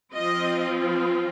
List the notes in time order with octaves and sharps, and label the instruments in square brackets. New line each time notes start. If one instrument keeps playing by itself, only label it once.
[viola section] F3 C4 F4 D#5